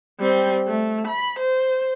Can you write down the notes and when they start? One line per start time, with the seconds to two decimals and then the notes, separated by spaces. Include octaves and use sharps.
0.19 G3 C4
0.67 A3
1.07 B5
1.39 C5